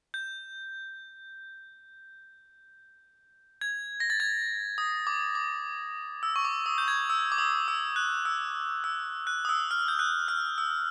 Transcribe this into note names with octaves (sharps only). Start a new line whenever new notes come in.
G6
G#6
A#6
A6
G#6
D#6
D6
D6
E6
C#6
D6
D#6
G6
G#6
E6
D6
D#6
E6
F#6
E6
E6
F#6
D#6
E6
F6
G6
F#6
F6
E6